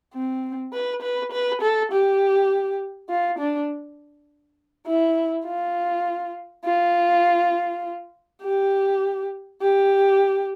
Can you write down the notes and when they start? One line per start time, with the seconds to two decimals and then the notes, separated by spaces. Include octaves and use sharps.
0.14 C4
0.73 B4
1.02 B4
1.32 B4
1.62 A4
1.92 G4
3.10 F4
3.39 D4
4.87 E4
5.46 F4
6.65 F4
8.42 G4
9.62 G4